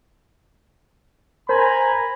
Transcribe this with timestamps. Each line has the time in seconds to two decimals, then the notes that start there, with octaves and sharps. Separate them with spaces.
1.49 A#4 C5 G#5 A#5 B5